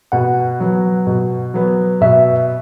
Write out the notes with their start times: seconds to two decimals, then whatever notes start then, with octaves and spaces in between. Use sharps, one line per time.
0.12 B2 F#5
0.60 F#3 B3
1.07 B2
1.54 F#3 B3
2.01 B2 E5